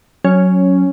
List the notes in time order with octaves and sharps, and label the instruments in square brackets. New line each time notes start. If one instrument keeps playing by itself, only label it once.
[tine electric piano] F#3 [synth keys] C#4